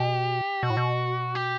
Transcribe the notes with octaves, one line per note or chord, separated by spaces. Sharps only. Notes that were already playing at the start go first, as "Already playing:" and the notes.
Already playing: B2 G4
B2 F#4
A2
B2
G4